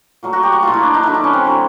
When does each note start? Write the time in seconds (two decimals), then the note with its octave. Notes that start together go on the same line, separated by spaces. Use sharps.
0.23 A#2 F#3 A3
0.33 F#4
0.43 G4
0.53 F#4
0.63 A#2 F#3 A3 F4
0.74 E4
0.83 D4
0.94 D#4
1.03 D3 F#3 A3 E4
1.14 D4
1.24 C#4
1.34 C4
1.44 D3 F#3 A3